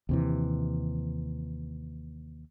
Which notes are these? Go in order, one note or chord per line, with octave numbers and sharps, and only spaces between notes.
D#2 C3 E3